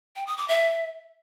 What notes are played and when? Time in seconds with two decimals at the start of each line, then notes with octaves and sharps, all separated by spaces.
0.16 G5
0.27 D#6
0.38 D6
0.48 E5